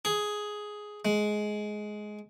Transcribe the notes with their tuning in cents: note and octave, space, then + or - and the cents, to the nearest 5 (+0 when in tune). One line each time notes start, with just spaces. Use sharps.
G#4 +5
G#3 +15